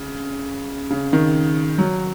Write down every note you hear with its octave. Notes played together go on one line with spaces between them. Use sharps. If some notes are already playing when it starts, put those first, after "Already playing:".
Already playing: C#3
C#3
D#3
F#3